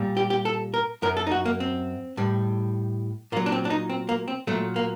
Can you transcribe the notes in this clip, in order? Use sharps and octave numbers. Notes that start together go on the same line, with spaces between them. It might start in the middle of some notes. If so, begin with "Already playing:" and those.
Already playing: A#2 G3
G4
G4
A4
A#4
F#2 F#3 A#4
A4
D#4
F#4
A#3
C4
A2 G3
A#2 F#3 A#3
D4
C4
D4
D#4
C4
A#3
C4
A#2 F#3 A3
A#3